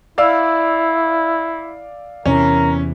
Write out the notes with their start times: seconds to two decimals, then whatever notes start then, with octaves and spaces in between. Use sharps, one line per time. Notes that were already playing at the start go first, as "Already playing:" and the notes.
0.18 E4 D5 F5 E6
2.26 E2 C3 E3 C#4 A#4